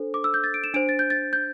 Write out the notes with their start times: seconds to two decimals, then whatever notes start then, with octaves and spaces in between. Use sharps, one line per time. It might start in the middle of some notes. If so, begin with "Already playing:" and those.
Already playing: D4 A4 C5
0.14 D6
0.24 E6
0.34 G6
0.44 A6
0.54 D7
0.64 E7
0.74 D4 C5 D7
0.89 A6
0.99 G6
1.10 A6
1.33 G6